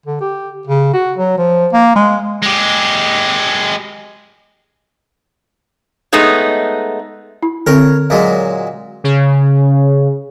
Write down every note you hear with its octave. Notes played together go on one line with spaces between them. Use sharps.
D3
G4
C#3
F#4
F#3
F3
A#3
G#3
G#3 G4
G#3 A3 B3 D#4 G#4 C#5
E4
D3 C4 A#4 C#5
A#2 F#3 G#3
C#3